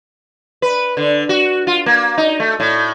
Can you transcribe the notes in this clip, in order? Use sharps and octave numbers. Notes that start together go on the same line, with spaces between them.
B4
D3
F#4
F4
A#3
D#4
A3
A2